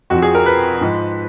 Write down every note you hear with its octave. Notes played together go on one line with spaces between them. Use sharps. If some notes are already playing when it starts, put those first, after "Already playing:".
F2 F3 F#4
G#4
A#4
B4
G#2 F3